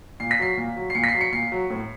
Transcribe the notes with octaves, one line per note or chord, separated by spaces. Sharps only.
A#2 C7
B6
F#3 C7
A#2
F#3
C7
A#2 C#7
B6
C7
F#3
C#7
A#2 C7
F#3
A2